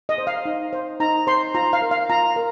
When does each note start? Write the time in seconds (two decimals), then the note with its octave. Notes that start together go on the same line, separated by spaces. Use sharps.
0.09 D#5
0.18 C5
0.27 F5
0.45 D#4
0.73 C5
1.00 D#4 A#5
1.27 C5 C6
1.55 F4 A#5
1.73 F5
1.82 A#4
1.91 F5
2.10 F4 A#5
2.36 A#4